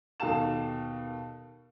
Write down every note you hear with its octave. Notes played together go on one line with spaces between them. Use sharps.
D#2 B2 A4 F5 A5 E7